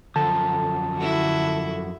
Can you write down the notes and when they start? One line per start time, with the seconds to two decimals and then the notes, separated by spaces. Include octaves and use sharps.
0.16 F#2 D3 F3 A5
0.97 E4 F#4